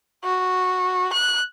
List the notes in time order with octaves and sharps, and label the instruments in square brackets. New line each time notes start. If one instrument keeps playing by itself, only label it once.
[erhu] F#4
F#6